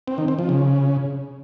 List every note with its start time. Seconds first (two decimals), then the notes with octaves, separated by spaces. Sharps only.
0.08 C4
0.18 D#3
0.28 C4
0.39 F3
0.49 C#3